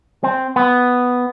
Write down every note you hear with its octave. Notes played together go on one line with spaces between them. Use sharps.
C4
B3